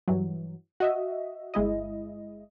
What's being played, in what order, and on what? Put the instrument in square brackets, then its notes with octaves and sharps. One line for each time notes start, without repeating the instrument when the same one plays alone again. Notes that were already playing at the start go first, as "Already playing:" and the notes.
[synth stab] G2 E3 F#3
F#4 D#5 E5
G1 G#3 E4 D#5